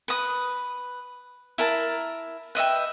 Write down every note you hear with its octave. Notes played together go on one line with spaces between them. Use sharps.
B4 D#6
E4 A#4 A5
B4 D#5 E5 G5